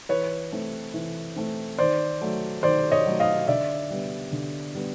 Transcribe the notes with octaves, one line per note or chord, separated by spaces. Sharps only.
E3 B4 C#5
A3 C4
E3
A3 C4
D#3 C5 D5
F#3 A3
D#3 C5 D5
C#5 D#5
F#3 A3
D#5 F5
D3 D5 E5
G3 B3
D3
G3 B3